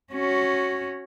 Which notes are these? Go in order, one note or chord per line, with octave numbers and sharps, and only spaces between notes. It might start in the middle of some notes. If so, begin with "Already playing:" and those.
C#4 F#4